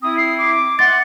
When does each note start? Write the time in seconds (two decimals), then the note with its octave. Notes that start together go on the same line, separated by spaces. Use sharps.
0.02 C4 E4 D#6
0.17 C7
0.38 D6
0.79 D#5 E5 F#5 C6 A6